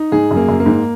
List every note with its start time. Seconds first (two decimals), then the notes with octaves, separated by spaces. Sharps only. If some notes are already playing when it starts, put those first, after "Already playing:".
Already playing: D#4
0.12 G#2 G#4
0.31 F#2
0.36 A#3
0.49 F#2
0.60 A#3
0.66 G#2